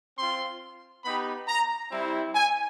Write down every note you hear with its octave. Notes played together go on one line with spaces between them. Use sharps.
C4 F4 C6
B3 D#4 G4 B5
A#5
G3 C4 E4
G#5